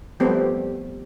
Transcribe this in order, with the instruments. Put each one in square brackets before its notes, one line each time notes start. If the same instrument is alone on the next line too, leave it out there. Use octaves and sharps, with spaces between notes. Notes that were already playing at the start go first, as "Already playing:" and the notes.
[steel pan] F3 G3 A3 B3 C4 G4